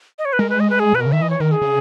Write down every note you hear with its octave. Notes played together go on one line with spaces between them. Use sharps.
D#5
C#5
B4
G#3 A#4
B4
D#5
B4
G#4
A#2 B4
B2 A#4
C#3
D#3 E5
E3 D#5
C#5
D#3 A#4
G#4
C#3